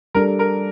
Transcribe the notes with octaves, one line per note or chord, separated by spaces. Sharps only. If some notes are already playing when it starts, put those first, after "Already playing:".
G3 D4 A4 A#4
A#4